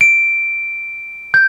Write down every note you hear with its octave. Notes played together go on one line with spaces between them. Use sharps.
D7
G6